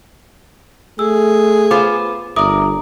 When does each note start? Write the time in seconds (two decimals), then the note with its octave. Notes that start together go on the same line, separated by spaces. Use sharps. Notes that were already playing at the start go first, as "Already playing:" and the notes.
0.99 A3 G#4 E6
1.71 B3 F4 C5 D6
2.36 G1 A#4 D5 E5 D6 D#6